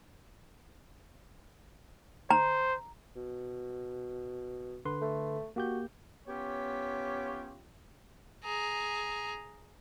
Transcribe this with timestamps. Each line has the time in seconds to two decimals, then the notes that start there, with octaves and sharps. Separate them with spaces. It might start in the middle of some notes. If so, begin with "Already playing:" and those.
2.31 C5 A#5
3.16 B2
4.85 D3 B4 C6
5.02 A3
5.56 A#3 F#4 G4 G6
6.27 B3 C#4 F4 G4 C#5
8.44 G#4 A#5